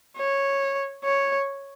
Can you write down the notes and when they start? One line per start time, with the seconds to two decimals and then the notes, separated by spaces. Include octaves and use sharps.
0.17 C#5
1.05 C#5